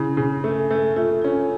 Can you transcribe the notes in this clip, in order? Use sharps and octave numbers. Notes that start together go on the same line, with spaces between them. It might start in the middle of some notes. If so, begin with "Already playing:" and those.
Already playing: C#3 E4
C#3
A3
A3
A3 F4
C#4 F4